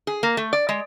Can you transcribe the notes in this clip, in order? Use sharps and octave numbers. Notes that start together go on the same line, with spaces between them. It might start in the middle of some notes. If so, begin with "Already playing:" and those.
G#4
A#3
A3
D5
G#3